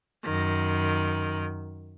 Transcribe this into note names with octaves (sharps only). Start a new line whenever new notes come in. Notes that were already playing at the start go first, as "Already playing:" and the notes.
F#2 D#3